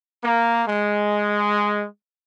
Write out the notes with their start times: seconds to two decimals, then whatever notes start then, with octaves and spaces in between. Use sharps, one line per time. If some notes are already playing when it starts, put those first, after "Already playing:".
0.23 A#3
0.67 G#3